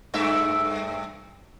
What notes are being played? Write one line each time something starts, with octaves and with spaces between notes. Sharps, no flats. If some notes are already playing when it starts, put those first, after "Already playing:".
G2 A3 E5